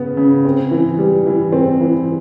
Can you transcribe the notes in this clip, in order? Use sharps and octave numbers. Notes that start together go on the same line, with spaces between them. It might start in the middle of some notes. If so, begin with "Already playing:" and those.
Already playing: C#3 B3
C#3
C4
E3
G3
E3
C4
E3